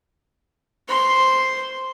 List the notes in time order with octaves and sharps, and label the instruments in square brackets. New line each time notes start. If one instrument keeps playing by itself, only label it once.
[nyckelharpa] C5 C6